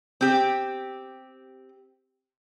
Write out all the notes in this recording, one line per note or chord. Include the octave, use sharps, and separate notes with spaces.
C4 G4